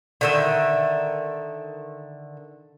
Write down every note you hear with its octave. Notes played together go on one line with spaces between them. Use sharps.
D3 D#3 E5